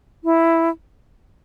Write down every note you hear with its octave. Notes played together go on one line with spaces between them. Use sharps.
E4